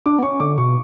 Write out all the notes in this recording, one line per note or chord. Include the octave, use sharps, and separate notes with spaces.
D4 D6
B3
C#4 C#6
D3 D6
B2 C#6